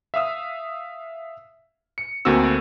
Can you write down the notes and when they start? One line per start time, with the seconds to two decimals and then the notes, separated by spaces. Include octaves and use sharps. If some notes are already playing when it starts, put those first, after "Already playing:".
0.14 E5 F5 D#6 E6
1.98 C#7
2.25 D2 A3 A#3 C4 F#4 E6